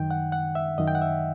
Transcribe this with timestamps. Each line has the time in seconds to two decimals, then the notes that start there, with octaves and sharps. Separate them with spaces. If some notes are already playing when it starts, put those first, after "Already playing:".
Already playing: F#2 D#3 G5
0.11 F#5
0.32 F#5
0.55 E5
0.78 F#2 D#3 D#5
0.87 G5
0.95 F#5
1.02 E5